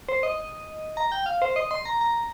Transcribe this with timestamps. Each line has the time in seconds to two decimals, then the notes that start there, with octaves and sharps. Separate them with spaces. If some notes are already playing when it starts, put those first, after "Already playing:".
0.09 C5
0.23 D#5
0.97 A#5
1.12 G5
1.26 F5
1.42 C5
1.56 D#5
1.71 C6
1.85 A#5
2.01 A#5